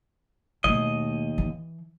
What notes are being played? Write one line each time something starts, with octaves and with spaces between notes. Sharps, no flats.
D#2 B2 A3 D#5
E3